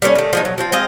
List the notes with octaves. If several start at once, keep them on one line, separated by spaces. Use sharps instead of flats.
G3 A3 B3 C#4
D#3 A3
F3 G#3 D#4
F#3
F3 C4 F4
G#3 C4 D#5 F5